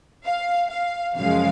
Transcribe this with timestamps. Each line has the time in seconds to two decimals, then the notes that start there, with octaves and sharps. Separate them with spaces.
0.25 F5
0.70 F5
1.15 F#2 C#3 F3 G#3 F5